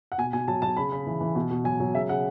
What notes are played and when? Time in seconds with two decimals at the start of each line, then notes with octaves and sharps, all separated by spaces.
0.12 F#5
0.18 B2 G#5
0.33 B2 G#5
0.48 F#3 A5
0.62 F#3 A5
0.77 C#3 B5
0.92 C#3
1.07 E3
1.21 E3
1.35 B2
1.51 B2
1.64 F#3 G#5
1.80 F#3
1.94 C#3 E5
2.09 C#3 F#5